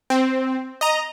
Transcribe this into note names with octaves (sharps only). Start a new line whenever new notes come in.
C4
D#5 A#5